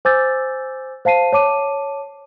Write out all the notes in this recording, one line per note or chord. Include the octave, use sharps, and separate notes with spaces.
C5 G#5 D6 E6 G6 A6
C5 F5 A5 C7 D#7
C#5 A5 D6 D#7